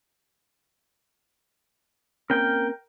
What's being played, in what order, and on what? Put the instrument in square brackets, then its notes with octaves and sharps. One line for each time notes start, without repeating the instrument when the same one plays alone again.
[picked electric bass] A#3 C4 C#4 [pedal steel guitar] A#4 G5